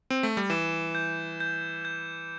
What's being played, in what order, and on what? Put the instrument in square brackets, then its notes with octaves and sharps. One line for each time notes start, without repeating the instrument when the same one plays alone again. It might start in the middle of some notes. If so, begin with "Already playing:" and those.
[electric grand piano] C4
A3
G3
[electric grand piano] E3 [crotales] E7
[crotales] G6
G6
G6